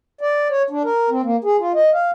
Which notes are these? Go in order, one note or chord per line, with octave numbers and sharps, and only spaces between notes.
D5
C#5
D4
A#4
C4
A#3
G#4
F4
D#5
F5